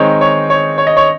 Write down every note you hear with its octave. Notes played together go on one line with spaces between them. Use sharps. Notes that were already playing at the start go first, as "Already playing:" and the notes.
Already playing: D#3 G#3 C4 D#4 C#5
C#5
C#5
C#5
D#5
C#5